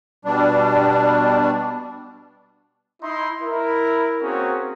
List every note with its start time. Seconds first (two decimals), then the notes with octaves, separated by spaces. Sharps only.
0.25 B2 G3 D4
3.03 D#4 E4 C6
3.41 E4 A#4
4.22 A#3 C4 C#4 F#4 G#4 A#4